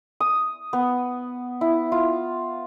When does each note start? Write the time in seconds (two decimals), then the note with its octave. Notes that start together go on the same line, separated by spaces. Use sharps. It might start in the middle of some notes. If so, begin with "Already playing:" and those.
0.20 D#6
0.73 B3
1.61 E4
1.92 F4